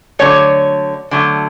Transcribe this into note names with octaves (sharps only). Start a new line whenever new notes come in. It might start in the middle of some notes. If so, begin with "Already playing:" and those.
D3 F#3 A3 C#5
D3 F#3 A3